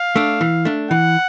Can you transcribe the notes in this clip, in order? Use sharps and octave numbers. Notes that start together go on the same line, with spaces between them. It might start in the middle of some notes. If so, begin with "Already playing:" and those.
Already playing: F5
A3 D4
E3
A3 D4
E3 F#5